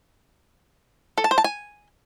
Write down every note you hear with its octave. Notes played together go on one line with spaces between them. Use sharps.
A4
A5
C5
A5
G#5